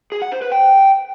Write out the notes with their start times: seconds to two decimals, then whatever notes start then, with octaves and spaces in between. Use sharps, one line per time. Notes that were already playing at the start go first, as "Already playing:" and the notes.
0.12 G#4
0.22 F#5
0.32 C5
0.42 B4
0.52 G5